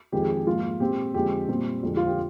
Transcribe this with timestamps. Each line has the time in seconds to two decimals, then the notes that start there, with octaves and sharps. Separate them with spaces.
0.12 F2 D#3 G#3 C4 G4
0.22 G#4
0.31 G4
0.47 G#2 F3 A#3 F4
0.80 A#2 G#3 C4 G4
1.14 F2 D3 G#3 C4 G4
1.48 A#2 G3 C4
1.83 F2 D3 G#3 C4
1.97 F4
2.07 G4